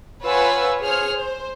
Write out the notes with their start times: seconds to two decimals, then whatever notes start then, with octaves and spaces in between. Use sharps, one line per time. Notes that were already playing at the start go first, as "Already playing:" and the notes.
0.23 F4 B4 C#5 F#5 G#5 E6
0.81 G#4 C5 C#5 F6
1.13 C5